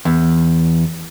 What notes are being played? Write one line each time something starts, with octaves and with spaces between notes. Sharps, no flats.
E2